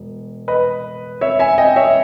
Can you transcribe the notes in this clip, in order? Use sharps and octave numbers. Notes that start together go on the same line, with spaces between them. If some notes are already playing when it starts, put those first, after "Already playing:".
Already playing: E1
B4 D#5
C#5 E5
E5 G#5
D#5 G5
C#5 E5